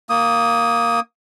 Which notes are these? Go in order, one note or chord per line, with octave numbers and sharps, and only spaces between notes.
A#3 D#6